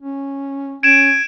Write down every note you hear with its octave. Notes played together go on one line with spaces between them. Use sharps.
C#4
C#4 G#6 D7 E7